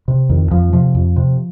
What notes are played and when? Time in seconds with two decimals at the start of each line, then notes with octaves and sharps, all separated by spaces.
0.08 C3
0.29 F2 D#3
0.51 F2 F3
0.73 C3 F3
0.95 F2
1.16 C3